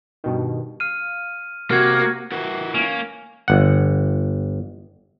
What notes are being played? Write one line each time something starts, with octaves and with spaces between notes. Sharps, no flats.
G2 B2 D#3
F5 F6 D#7
C3 A#3 F#4 F6 G#6
E4 F#4 A#4 B4
A#3 C#4
G1 F#5